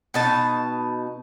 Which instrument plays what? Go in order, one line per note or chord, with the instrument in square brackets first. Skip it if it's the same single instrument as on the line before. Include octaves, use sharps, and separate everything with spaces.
[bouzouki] B2 D#4 A5